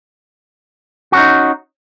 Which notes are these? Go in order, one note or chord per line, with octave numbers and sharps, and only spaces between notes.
C#4 D#4 F#4